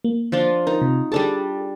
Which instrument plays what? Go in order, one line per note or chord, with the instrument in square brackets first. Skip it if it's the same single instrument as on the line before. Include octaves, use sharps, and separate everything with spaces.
[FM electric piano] A#3
[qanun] F3 D4 F4
[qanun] D#4 [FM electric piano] A#4
[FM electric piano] C3
[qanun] G3 D4 A5 [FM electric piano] G#4 A4